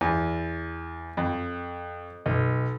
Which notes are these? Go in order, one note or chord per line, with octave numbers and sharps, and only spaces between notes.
E2
F2
B1